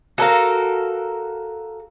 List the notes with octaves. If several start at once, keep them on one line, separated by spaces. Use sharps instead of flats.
F#4 A4 A#4 F5